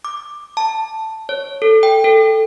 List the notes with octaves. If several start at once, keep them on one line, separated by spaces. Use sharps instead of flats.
D6
A5
C#5
A4
G5
A4